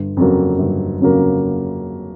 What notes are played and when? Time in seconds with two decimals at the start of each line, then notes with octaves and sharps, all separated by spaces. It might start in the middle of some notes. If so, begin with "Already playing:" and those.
Already playing: G1
0.17 F2 C#3 F#3 A#3
0.59 G1
1.00 F2 C#3 F#3 A#3